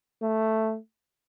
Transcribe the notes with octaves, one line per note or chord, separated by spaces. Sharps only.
A3